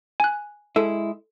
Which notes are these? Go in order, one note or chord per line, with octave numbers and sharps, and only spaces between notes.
G#5 F#6
G#3 E4 A4